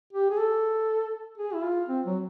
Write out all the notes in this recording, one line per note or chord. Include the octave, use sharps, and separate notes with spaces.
G4
G#4
A4
G#4
E4
F4
C4
F#3